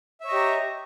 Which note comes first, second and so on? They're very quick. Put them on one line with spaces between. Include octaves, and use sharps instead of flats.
E5 C#5 D#5 G4 A#5